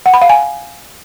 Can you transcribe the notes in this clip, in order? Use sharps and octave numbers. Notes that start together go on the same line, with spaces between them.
F#5
B5
F5
G#5